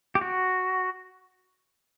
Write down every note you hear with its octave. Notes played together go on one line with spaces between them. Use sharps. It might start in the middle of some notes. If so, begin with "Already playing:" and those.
G4
F#4